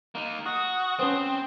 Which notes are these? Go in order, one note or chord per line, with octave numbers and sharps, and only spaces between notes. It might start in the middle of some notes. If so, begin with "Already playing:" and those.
A#3 D#4
F#4 D#6
C4 C#4 B4 C5